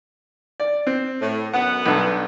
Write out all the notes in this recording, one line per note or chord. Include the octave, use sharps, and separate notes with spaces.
D5
C4
A2
F#2 D3 B3 F#5
B1 G2 A4